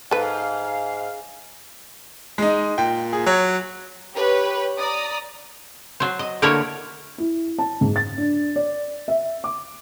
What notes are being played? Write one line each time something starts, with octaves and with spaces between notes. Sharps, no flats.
G#2 A4 B4 F5
G#3 D#4
A#2 G5
G#4
F#3 C#5
G4 B4 C#5
D5 A#5 D#6
F#3 C5
D#5
D3 A3 A#3 E4 C#5 A#5
E4
A5
G#2
A6
D4
D5
E5
D6